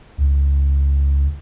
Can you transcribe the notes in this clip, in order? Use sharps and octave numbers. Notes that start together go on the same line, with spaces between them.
C#2